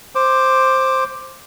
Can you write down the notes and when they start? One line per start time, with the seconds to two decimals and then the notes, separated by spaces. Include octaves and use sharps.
0.15 C5 D6